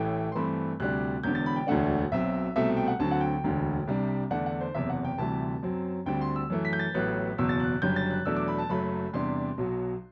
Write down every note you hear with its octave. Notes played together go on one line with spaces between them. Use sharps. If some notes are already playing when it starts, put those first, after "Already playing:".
Already playing: A1 A2 E3 A3 G5
C6
G2 E3 A3 C4 B5
D2 C3 G3 D4 F#6
E1 E2 D3 G6
A6
B5
G5
E1 D2 D3 A3 D4 F#5
B1 B2 F#3 C4 E5
C2 B2 A3 C4 E5
G5
F#5
D2 D3 F#3 C4 A5
F#5
G5
E1 D2 D3
C2 C3 G3 D4
E2 D3 A3 D4 F#5
F#5
C5
F#1 E2 C3 E5
F#5
G5
D2 C3 E3 G3 A5
F#2 F#3 C4
D2 D3 G3 C4 G5
C6
E6
F#2 E3 A3
B6
G6
A6
A1 A2 F#3 B3 F#6
F#1 E2 B2 E6
A6
F#6
F#1 F#2 D3 G3 G6
A6
F#6
E2 B2 F#3 A3 D4 E6
D6
B5
A5
F#1 F#2 F#3 A3 B5
E2 C3 G3 D4 C6
B1 B2 F#3